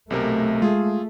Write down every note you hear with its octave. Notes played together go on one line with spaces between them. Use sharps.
B1 C3 A3 A#4
G#3 F4 G#4